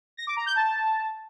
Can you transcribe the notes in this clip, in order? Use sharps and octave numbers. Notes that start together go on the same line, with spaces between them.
A#6
D6
A#5
G6
A5